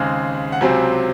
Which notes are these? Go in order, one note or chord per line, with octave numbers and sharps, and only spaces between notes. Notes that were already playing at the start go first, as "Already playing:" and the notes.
Already playing: D#2 C#3 G#3 C4
F#5
C#2 C3 F#3 C4 G#5